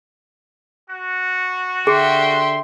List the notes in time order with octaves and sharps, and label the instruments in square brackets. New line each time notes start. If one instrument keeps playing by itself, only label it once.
[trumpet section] F#4
[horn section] D3 C6 [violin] G4 E5 [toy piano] G#4